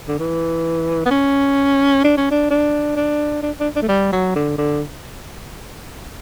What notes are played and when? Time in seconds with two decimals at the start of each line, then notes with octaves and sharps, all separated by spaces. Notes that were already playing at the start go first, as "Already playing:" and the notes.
0.08 D3
0.19 E3
1.06 B3
1.11 C#4
2.04 D4
2.17 C#4
2.31 D4
2.50 D4
2.96 D4
3.43 D4
3.60 D4
3.76 D4
3.82 A3
3.88 G3
4.12 F#3
4.36 D3
4.58 D3